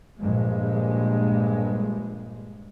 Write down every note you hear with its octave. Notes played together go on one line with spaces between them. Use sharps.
A#1 G2 G#3